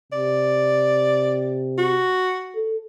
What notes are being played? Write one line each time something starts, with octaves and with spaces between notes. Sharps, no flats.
C3 D5
F#4
A4